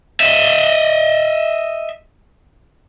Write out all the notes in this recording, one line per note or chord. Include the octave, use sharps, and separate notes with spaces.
D#5 E5